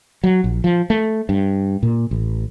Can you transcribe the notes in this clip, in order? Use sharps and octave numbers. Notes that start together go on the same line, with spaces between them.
F#3
A#1
F3
A3
G2
A#2
A1